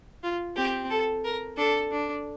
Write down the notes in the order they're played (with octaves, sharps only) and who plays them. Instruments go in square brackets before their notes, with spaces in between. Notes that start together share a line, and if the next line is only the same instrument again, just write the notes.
[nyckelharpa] F4
[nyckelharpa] C4 [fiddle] G4
[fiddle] A4
A#4
[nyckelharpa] D4 [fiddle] A4
[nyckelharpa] D4